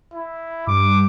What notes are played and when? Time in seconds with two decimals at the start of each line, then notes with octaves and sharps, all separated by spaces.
0.14 E4
0.67 G2 D6